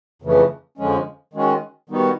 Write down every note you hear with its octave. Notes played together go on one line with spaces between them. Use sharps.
F2 C#3 E3 A3
F2 D3 F3 G#3 C#4
D#3 G#3 C#4 F#4
D#3 G3 B3 D#4 F#4